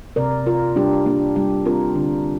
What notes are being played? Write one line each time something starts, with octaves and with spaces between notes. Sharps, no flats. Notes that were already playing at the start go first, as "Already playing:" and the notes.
C3 A#4 D5
C3 F4 A#4
G3 D4 G4
A#3 D4
G3 D4 G4
C4 F4 A#4
D3 D4